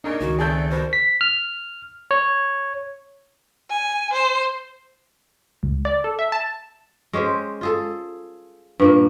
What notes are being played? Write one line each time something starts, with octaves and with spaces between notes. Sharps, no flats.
C#3 A#3 D4 D#4 A#4
C#2 D#3 F#4
C#3 A3 C4 G#4 D5 A5 G6
B2 G3 A#4 C5
B6
F6
C#5
G#5
C5
C#2
D5
A4
E5
A5
G#3 C#4 G4 C5
F4 G#4 A4
G2 A#2 A#3